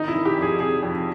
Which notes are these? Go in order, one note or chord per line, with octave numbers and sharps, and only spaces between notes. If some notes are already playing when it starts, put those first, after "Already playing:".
Already playing: D#3 D#4
E4
D#3
G4
F2 G#4
C3 G#4
F2